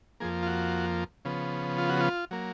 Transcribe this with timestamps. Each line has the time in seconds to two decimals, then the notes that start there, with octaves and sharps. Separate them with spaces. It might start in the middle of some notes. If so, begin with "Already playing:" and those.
0.20 F2 F3 A#3 G#4
0.43 F4
0.47 F#4
1.25 C#3 F3 B3
1.78 F4
1.89 F#4
2.00 F4
2.31 F#3 A#3